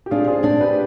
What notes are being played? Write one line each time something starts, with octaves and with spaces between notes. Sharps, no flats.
G4
D4 F4 G#4
G#4 C5
D4
G4 B4